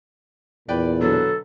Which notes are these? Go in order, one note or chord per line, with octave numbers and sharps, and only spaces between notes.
E2 A#2 B4 D5 G5
B2 D3 F#3 A4